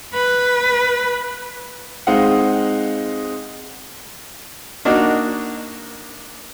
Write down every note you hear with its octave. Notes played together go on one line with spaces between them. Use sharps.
B4
G#3 C4 D#4 D#5 F5 F#5
A#3 D4 D#4 F#4